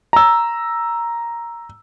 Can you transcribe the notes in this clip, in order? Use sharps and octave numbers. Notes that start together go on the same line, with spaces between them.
A#5 E6